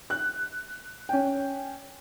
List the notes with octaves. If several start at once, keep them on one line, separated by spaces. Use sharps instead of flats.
F#6
C#4 G5